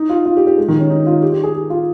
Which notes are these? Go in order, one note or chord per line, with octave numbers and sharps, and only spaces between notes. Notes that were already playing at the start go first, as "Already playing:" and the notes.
Already playing: D#4
F4
F4
G4
G4
G#3
D#3
C#4
D#4
F4
G4
G4
G#4
G4
F4